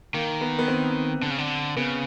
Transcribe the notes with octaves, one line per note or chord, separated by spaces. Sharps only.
D#3 A#3
B3
B3
C4
D3
C#3
D3
C#3 B3